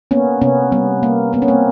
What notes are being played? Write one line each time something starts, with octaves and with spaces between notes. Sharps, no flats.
A#3 B3 C#4
C3 B3 C#4
G3 B3
A#3
A#3 B3
C#4
A#3 C4